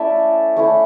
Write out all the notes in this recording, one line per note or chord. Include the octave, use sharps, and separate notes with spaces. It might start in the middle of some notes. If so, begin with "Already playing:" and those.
Already playing: A3 C#4 E4 D5 E5
A3 C#4 E4